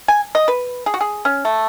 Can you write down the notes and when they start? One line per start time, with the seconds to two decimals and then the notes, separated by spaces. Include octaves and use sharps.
0.08 G#5
0.35 D#5
0.48 B4
0.86 G#4
0.94 F#4
1.01 G#4
1.25 C#4
1.45 A3